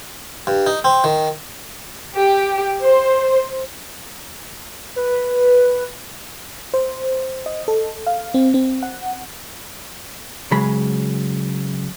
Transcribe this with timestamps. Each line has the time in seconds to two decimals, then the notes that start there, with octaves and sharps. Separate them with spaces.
0.47 G2
0.66 D#4
0.84 C4
1.04 D#3
2.17 G4
2.82 C5
4.96 B4
6.74 C5
7.46 D#5
7.68 A4
8.07 F5
8.34 C4
8.54 C4
8.83 F#5
10.51 C#3 F#3 G#3 B5